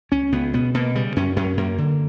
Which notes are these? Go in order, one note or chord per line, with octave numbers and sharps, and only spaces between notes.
C#2 C#4
C#2 B3
B2 B3
B2 A#3
C#3 G3
F#2 C#4
F#2 C#4
F#2 A#3
D3